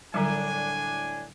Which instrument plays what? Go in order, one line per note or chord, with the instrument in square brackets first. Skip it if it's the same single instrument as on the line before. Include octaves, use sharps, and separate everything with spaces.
[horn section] A2 D4 G#5 [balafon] D3 F#3 G3